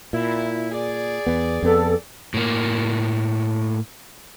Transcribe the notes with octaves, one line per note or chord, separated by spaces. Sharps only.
A#2 E4
G#4 D5
E2 B3
F2 B3 A4
A2 A#3